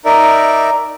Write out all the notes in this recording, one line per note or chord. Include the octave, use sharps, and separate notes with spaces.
D#4 A#4 D5 E5